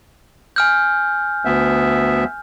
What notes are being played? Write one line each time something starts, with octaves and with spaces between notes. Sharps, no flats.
G#5 F6 G6
D2 B3 E5